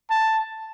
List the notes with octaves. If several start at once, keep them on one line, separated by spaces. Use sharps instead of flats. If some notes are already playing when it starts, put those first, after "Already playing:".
A5